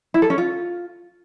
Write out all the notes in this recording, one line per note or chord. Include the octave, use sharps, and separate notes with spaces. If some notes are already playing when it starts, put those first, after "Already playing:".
E4
A4
C#4
F4